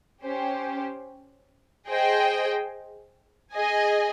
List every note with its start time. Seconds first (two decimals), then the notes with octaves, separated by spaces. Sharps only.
0.23 C#4 G4 C5
1.89 G#4 C5 D#5 G5
3.55 G#4 D#5 G#5